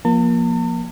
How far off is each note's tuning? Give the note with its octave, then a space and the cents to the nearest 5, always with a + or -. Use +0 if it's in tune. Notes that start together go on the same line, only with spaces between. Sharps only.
F3 +0 A#3 +20 A5 +45